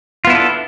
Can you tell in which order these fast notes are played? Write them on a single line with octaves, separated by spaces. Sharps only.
F4 B3 E4 D4 A4